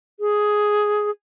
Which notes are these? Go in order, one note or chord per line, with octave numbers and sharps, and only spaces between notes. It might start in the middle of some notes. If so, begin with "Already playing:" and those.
G#4